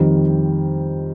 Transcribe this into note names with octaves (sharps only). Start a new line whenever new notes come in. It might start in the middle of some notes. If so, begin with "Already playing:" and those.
Already playing: F2 D#3 G3 C4